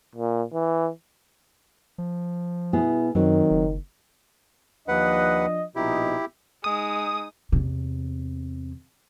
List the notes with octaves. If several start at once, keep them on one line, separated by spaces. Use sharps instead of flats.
A#2
E3
F3
B2 B3 E4 G#4
F#2 D#3 F#3 C4
F#1
D#2 F3 D4 B4 D#5 F#5
A#1 B2 D#4 E4 G4
G#3 D#4 D#6
E2 C3